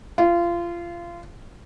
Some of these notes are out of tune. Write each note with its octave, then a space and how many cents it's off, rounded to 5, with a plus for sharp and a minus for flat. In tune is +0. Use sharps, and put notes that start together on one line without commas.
F4 -25